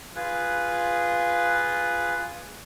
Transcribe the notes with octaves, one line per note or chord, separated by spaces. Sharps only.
F4 G#4 B4